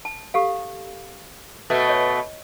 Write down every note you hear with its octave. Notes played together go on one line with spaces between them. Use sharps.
A5
G4 A4 F5
B2 A3
C#5 D#5